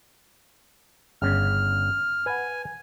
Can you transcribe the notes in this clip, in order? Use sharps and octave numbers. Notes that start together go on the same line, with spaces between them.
G1 C#3 F6
B4 F#5 G#5